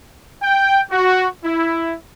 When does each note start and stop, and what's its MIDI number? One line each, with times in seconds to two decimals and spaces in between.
0.43 0.82 79
0.91 1.28 66
1.44 1.94 64